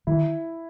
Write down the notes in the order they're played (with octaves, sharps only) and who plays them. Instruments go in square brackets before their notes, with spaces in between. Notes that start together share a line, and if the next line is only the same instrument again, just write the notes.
[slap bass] D#3 [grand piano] E4